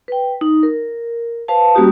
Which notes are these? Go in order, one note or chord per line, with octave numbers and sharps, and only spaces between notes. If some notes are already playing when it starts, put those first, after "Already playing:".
B4 G5
D#4
A#4
B4 C5 F5 A5
G3 A#3 C#4 F#4 G4 D#6